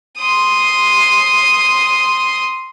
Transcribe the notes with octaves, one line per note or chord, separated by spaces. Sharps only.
C6 D#6